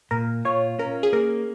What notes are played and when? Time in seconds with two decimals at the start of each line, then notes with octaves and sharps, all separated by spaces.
0.11 A#2 A#4
0.45 F4 C#5
0.79 C#4 A#4
1.03 G#4
1.13 A#3 A#4